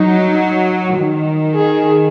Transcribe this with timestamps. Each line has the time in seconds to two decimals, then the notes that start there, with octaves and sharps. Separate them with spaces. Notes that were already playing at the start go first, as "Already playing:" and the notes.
Already playing: F#3 D#4
0.99 D#3
1.55 G#4